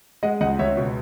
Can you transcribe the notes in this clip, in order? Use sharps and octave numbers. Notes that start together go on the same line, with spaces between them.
G#3 D#5 F#5
C#2 D#5 F#5
C#2 C#5 E5
B2